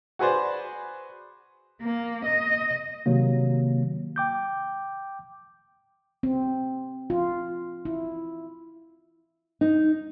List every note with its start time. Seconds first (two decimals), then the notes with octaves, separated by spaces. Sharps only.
0.19 F#4 G#4 B4 C5 D5
1.82 A#3
2.25 D#5
3.06 C3 D#3 F#3 A#3
4.16 G5 D6 G6
6.23 C4
7.10 F4
7.85 E4
9.61 D#4